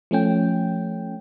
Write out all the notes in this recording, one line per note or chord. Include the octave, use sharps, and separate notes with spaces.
F3 A3 C#4 G5